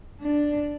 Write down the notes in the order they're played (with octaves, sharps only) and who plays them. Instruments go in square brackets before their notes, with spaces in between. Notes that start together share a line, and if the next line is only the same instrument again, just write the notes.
[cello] D4